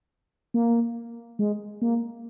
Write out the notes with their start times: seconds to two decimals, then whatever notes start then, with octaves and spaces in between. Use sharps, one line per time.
0.54 A#3
1.39 G#3
1.82 A#3